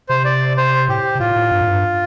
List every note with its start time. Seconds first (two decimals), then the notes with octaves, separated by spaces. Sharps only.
0.09 C3 C5
0.25 D5
0.57 C5
0.88 A2 G4
1.15 C3
1.20 A2 F4
1.36 A2
1.52 G2
1.61 A2
1.68 G2